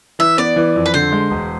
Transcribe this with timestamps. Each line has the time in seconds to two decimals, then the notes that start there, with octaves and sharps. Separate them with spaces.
0.19 E3 E5
0.38 B3 D5
0.56 E3
0.76 F2
0.86 B4
0.94 D3 C5
1.12 G#3
1.31 E1